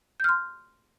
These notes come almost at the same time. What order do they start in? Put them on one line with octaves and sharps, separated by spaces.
G6 F6 C6